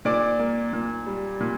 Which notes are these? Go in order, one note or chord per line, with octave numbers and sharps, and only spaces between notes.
A#2 D5 D6
A#3
A#2
G3
A#2